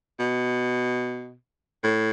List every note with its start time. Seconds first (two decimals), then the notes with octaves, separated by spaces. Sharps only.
0.20 B2
1.84 A2